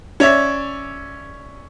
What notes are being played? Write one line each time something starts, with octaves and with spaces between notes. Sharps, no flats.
C#4 C#5 D5 E5